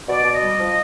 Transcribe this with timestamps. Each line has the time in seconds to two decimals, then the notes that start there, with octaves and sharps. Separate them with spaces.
0.09 B2 D5
0.25 B2
0.33 D#5
0.41 G3
0.59 F3